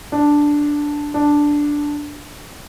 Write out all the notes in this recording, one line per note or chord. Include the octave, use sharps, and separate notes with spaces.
D4
D4